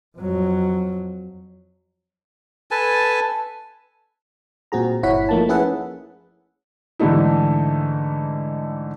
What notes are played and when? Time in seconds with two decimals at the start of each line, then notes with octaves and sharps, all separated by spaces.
0.18 F2 F#3
2.71 A4 B4 G#5 A5
4.72 A#2 C4 F#4 G#4 A#5
5.03 G1 E4 C#5 F#5 B6
5.29 F3 A3 A#3 D#4 A5
5.49 C#4 E4 G#4 B4 E5 F#5
6.99 G#2 D3 E3 A3 D#4 E4